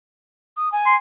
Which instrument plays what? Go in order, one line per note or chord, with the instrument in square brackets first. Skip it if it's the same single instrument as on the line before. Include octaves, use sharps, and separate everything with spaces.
[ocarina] D#6
G#5
[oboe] C6